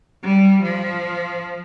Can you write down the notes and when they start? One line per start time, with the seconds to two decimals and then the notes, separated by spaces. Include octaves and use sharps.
0.23 G3
0.63 F3